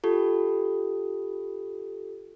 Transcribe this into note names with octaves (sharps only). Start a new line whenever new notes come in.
F4 G4 A4